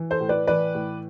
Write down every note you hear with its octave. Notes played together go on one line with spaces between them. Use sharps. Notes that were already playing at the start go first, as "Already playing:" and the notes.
Already playing: E3
A4 C5
A2
B4 D5
E3 B4 D5
A2